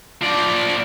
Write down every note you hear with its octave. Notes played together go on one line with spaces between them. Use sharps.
F3 D5